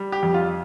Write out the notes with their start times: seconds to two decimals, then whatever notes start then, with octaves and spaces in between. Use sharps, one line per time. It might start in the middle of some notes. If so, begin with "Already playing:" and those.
Already playing: G3
0.12 G4
0.23 F2
0.34 F4